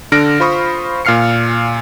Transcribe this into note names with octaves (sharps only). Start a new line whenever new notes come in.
D3 D4 F6 A#6 D7
F4 C5 B5 C#6 D#6
A#2 F5 F6 C7 C#7